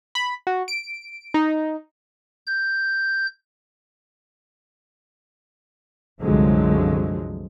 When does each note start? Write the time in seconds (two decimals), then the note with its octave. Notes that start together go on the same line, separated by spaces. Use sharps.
0.15 B5
0.47 F#4
0.68 D7
1.34 D#4
2.47 G6
6.22 C2 F#2 D3 F3 F#3 G#3